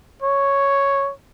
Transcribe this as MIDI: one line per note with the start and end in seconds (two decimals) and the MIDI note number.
0.22 1.12 73